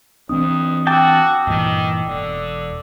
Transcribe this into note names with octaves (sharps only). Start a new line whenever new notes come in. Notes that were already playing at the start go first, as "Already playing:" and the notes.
F2 E3 C4 D4 D#6
F#4 G5 A5 D6 E6
G2 A#2 D#3 E3
E1 D3